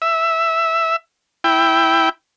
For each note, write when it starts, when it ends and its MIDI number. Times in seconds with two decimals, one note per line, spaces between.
0.02 0.96 76
1.44 2.09 64
1.44 2.09 79